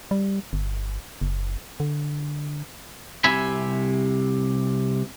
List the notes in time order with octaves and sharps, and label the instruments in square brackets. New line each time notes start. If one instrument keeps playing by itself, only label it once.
[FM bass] G3
G1
F#1
D3
[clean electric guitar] C2 C3 E5 G#5 B5